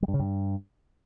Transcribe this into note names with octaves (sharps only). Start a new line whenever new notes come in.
G3
G2
C#3
G2